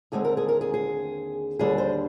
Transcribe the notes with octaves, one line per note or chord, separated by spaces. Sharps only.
D#2 D3 G#3 C4 G#4
A#4
G#4
A#4
G#4
G#4
D#2 D3 G3 D4 G#4
C5